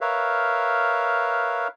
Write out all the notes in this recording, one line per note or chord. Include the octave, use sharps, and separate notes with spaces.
A#4 B4 C#5 E5 F5